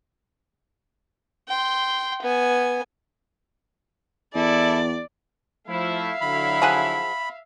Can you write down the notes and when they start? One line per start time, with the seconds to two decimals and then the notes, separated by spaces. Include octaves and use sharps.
1.48 G5 C6
2.22 B3 G#5
4.35 E2 E4 A4 D5
5.68 F3 A3 E4 E5 F5
6.21 D3 F#3 E4 B5
6.62 F3 G#4 F#5